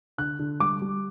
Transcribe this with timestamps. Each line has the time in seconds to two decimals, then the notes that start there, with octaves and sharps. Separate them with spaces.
0.18 D3 F#6
0.39 D3
0.60 G3 D6
0.81 G3